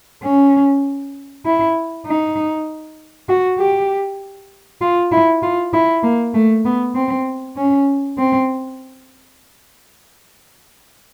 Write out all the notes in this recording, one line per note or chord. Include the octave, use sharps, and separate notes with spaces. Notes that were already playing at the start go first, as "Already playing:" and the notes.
C#4
E4
D#4
F#4
G4
F4
E4
F4
E4
A#3
A3
B3
C4
C#4
C4